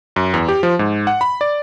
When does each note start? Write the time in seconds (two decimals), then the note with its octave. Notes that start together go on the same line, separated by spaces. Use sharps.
0.16 F#2
0.34 E2
0.48 G4
0.63 F3
0.79 G#2
1.07 F#5
1.21 B5
1.41 D5